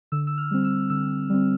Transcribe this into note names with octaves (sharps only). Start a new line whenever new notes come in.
D3 E6
E6
F6
G3 C4
E6
D3 E6
G3 C4